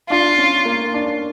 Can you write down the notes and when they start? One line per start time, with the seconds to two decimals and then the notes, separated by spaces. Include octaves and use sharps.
0.10 D4 F4
0.38 C#4
0.65 A#3
0.94 D4